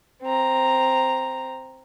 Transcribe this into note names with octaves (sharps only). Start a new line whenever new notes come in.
C4 A#5